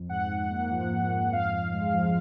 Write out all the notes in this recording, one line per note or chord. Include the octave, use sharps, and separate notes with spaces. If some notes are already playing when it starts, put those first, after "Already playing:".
Already playing: F2
G#2 F#5
G#2
A#3
F3
G#2
G#2
F2 F5
F2
G#3
F3